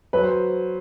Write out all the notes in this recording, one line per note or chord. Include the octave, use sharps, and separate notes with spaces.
F#3 B4
C5